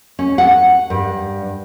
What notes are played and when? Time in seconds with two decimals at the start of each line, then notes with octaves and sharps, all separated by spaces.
0.19 C#4
0.38 F#5
0.90 G2